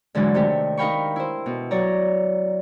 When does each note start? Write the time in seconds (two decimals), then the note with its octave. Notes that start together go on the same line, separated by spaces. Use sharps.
0.15 G#2 D3 E3 F#3 G#3
0.34 C3 D#3 A3 C4 D4 G4
0.77 D#4 A#4 F5 G5 B5 C#6
1.16 E4 C5
1.46 B2
1.71 F#3 C#5 D5 A#5